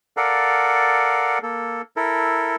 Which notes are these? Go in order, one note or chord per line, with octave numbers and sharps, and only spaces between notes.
A4 A#4 D5 F5 F#5
A#3 A4
E4 A4 A#4